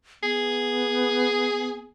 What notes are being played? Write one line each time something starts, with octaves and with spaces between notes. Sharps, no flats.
B3 G#4